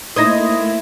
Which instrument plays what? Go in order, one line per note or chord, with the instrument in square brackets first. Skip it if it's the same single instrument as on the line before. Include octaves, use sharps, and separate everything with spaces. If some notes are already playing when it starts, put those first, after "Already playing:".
[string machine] A3 A#3 [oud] D#4 C5 [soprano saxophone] E4 [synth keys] D#6 G#6 A#6